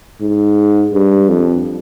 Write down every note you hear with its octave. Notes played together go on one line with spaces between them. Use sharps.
G#2
G2
F2